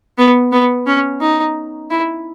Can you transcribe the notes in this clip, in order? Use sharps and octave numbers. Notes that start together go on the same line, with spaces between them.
B3
B3
C#4
D#4
E4